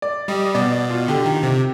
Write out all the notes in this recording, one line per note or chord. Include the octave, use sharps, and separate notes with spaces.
D5
G3 D#5
D#5
B2 D5
D5
F4
D3 G4
D#3
C3